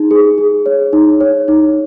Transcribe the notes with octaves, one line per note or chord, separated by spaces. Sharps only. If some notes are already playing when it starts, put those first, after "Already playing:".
Already playing: D#4 G#4
G#4
G#4
C#5
D#4
C#5
D#4